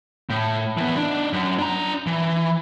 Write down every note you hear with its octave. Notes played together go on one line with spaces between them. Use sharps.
A2
E3 B3
D4 D#4
F#2
D4 A#5
E3